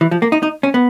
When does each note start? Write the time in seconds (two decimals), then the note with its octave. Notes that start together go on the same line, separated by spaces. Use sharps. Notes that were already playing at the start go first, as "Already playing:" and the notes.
0.01 E3
0.11 F3
0.22 A#3
0.32 D#4
0.43 D#4
0.63 C#4
0.74 B3